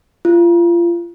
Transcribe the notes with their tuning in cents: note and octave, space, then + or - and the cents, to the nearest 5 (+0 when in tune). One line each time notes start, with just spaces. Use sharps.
F4 -30